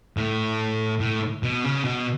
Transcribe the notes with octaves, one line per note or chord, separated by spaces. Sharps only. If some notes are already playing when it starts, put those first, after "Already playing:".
A2
A2
B2
C#3
B2